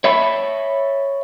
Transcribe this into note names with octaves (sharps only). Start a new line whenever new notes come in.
C#5 E5 B5